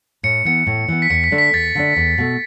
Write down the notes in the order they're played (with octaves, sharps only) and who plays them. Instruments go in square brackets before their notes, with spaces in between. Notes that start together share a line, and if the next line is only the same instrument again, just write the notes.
[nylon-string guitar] A2 [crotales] C#7
[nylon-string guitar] E3 B3 [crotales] C#7
[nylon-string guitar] A2
E3 B3
[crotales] B6
[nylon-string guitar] E2 [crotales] C#7
[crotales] B6
[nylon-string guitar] D3 A3 D4
[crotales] B6
[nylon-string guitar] E2 [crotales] A6
[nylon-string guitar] D3 A3 D4
E2
B2 A3